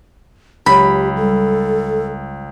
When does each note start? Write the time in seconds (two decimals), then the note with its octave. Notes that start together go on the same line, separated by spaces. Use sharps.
0.66 C#2 F#3 G4 C#5 B5
1.16 G3 A4